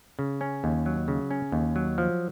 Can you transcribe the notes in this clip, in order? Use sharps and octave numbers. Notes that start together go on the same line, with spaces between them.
C#3
C#4
D#2
F#3
C#3
C#4
D#2
F#3
F3